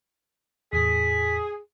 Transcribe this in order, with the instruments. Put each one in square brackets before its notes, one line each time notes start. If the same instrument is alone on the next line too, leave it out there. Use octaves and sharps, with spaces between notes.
[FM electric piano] E2 A2 [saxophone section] G#4 [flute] B6